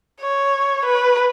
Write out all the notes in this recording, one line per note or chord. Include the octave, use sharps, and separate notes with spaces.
C#5
B4